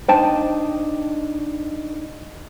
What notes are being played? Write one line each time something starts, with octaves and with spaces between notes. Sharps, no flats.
D4 D#4 C5 D#5 G5 A5